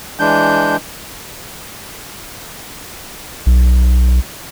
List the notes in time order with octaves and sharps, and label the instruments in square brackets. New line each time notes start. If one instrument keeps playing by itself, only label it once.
[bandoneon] E3 G#3 D4 G6
[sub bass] B1